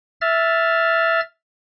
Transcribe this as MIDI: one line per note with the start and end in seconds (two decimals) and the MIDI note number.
0.21 1.21 76
0.21 1.21 89
0.21 1.21 93